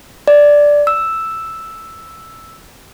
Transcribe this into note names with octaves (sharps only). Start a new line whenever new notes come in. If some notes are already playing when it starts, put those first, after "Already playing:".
D5
E6